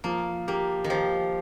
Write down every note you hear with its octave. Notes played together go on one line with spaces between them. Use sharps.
F3 A#3
A#3 G4
D#3
F3 G4